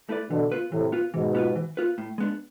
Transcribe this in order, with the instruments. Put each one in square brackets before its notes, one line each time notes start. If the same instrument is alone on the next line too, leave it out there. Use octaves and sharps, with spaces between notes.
[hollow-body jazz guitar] A3 E4 B4 D5
[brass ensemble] B2 D3 [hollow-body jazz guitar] E3
[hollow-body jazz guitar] B3 F4 B4
[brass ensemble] A2 C3 [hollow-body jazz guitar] E3
[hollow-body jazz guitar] B3 F4 B4
[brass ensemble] G#2 B2 [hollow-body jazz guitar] E3
[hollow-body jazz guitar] B3 F4 B4
E3
B3 F4 B4
A2
G#3 B3 D4